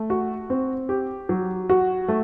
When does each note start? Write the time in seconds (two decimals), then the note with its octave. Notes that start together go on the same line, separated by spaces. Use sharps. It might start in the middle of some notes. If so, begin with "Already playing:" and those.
Already playing: A3
0.10 F#4
0.50 C4
0.89 G4
1.29 F#3
1.69 F#4
2.08 A3